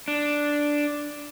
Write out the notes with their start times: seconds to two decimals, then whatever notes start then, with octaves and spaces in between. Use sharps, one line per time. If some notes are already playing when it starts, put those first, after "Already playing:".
0.08 D4